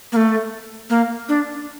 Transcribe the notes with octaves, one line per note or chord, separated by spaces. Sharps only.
A#3
A3
A#3
D4